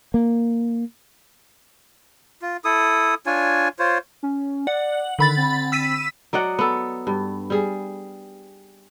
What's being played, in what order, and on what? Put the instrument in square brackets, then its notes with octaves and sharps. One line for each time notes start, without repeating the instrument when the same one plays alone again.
[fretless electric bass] A#3
[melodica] F4
E4 A4 D#6
D4 F4 C#5 G#5
F4 C5 C#5
[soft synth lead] C#4
[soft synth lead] D5 [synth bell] F#5
[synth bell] D3 B5 A6 [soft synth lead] D#3
[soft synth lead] C4
[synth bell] E6 B6 D#7
[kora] F#3 D5 D#5 F#5
B3 A4
G2
G3 G#4